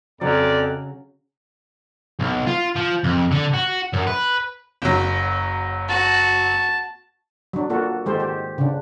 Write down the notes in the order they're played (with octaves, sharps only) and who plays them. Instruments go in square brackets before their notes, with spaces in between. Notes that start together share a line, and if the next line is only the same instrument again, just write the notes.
[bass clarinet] F2 [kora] C#3 F#3 [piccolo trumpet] D5
[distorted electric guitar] B1
F4
F3
F2
D3
F#4
F#2
B4
[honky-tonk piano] F#1 F#3
[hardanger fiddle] F#4 [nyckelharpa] A5
[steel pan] F#3 D4
A#3 F4 F#4 A4
D#3 G#3 G4 A4 C5
G4
C#3 D4